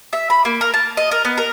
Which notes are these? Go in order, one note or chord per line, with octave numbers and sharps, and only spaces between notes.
E5
B5
A#3
A#4
A5
D#5
A#4
B3
A#4